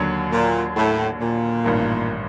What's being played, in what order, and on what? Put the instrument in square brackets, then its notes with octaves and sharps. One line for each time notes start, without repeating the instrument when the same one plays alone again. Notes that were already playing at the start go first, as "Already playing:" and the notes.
Already playing: [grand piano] D#2 D3 F#3
[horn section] A#2
A2
A#2
[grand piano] A1 G2 D#3